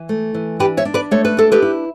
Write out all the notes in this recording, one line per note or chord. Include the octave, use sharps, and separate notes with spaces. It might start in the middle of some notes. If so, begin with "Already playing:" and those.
Already playing: E3
A3
E3
D4 G4 B4
C#5 E5
D4
B4 D5
A3 C#5
B4
D4 A4
G4 B4
E4